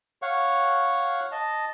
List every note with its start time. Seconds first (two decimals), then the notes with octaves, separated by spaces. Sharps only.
0.22 C#5 F5 F#5 C#6
1.32 D#5 A5